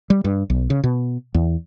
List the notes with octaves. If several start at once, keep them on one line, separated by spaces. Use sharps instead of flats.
G3
G2
B1
C#3
B2
E2